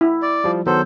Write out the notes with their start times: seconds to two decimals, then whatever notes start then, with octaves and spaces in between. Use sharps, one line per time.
0.01 E4
0.22 D5
0.44 F3 G3
0.67 D#3 F#3 B3 A4 C5